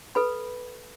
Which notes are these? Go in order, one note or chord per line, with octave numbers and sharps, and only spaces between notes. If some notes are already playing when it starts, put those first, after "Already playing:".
A4 B4 B5